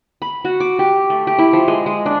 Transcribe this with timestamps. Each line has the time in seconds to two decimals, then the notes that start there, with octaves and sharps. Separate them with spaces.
0.22 B5
0.45 F#4
0.60 D6
0.79 G4
1.10 A3
1.27 G4
1.38 E4
1.53 F3
1.68 G#3
1.86 G#3
2.06 D4